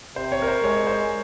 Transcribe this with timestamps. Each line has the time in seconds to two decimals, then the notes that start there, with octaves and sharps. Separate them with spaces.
0.16 C3 C5
0.32 C#5
0.42 A#4
0.48 C5
0.63 G#3 C#5
0.87 C5